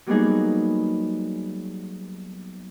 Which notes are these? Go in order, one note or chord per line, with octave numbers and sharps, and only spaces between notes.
F#3 G3 A#3 B3 D#4 G#4